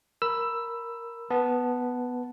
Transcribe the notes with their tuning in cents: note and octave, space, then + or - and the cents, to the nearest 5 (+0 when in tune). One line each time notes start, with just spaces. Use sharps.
A#4 +0 B5 +0 E6 +10
B3 +0 A5 -5